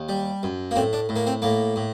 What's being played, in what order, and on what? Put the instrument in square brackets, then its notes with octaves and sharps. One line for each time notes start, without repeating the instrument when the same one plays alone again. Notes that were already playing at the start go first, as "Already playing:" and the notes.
Already playing: [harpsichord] D#2
G3
F#2
A#3
A2 C4
D4
A2
A#3
C4
A2 A#3
A2